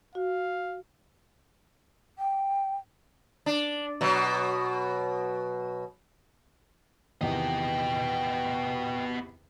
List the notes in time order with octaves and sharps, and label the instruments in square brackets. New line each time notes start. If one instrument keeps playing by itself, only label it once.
[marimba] F#4 [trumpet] F5
[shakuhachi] G5
[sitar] D4
B2 F#3
[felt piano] E2 C3 D#3 [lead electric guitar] B3 D#5 [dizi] G5